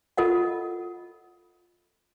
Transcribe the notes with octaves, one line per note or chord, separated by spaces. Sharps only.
F4 A4 D#5 F#5